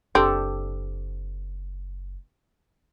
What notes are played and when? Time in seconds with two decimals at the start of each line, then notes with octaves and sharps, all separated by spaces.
0.15 F#1 C4 D4 G4 A4